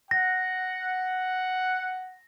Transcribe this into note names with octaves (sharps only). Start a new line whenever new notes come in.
F#5 A#6